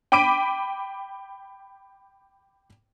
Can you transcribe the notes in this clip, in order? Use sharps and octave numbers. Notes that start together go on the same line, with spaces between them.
G5 B5 D6 B6 D7 D#7